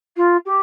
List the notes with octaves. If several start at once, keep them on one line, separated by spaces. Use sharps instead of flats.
F4
G4